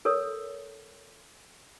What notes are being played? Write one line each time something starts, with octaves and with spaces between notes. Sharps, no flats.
A4 A#4 C#5 D#6